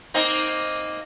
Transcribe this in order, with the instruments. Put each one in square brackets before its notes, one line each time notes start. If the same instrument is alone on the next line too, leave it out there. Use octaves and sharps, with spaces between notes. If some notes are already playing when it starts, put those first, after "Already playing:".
[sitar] A#3 C4 D#4